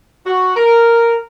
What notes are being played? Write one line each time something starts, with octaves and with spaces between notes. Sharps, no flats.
F#4
A#4